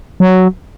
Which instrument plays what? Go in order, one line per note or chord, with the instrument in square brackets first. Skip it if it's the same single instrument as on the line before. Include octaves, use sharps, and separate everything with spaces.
[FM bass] F#3